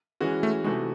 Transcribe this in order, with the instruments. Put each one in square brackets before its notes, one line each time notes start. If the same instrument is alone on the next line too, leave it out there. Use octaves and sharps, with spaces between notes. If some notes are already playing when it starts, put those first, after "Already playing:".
[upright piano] E3 G#3 C#4 F#4
[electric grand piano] A3
[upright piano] C3 E3 A3 D#4 F#4 [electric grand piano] G#3